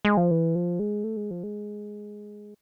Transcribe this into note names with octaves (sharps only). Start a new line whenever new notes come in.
G#3
F3
E3
F3
G#3
A3
G#3
F3
G#3